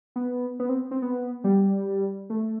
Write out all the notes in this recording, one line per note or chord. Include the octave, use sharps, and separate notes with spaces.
B3
B3
C4
C4
B3
G3
A3